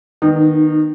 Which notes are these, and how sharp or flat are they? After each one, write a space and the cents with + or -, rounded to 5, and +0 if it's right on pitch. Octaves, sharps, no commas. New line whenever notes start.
D#3 +0 B3 -10 D#4 -30